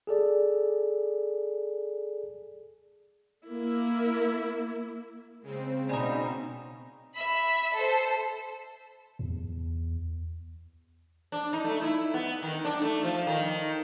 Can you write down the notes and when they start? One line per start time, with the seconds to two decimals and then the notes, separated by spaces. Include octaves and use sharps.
0.07 G#4 A4 D5
3.47 A#3 E4
5.44 C#3 G#3 C4
5.89 B2 D#4 D5 G#5 A#5 B5 D#6
7.15 E5 B5
7.74 A4 C5
9.19 E2
11.32 D4
11.53 D#4
11.65 A3
11.82 E4
12.14 B3
12.42 D#3
12.65 D4
12.81 A3
13.03 F3
13.27 D#3